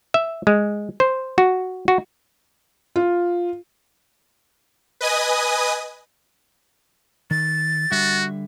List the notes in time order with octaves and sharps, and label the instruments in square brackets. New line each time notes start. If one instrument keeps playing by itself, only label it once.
[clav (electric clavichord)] E5
G#3
C5
F#4
F#4
[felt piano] F4
[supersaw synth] B4 D#5 G#5 D#6
[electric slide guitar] D#3 [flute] A6
[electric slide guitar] D3 G3 E5 [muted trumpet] F#4